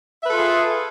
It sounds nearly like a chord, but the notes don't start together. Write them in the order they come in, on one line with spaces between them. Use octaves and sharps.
E5 B4 A4 F4 G#4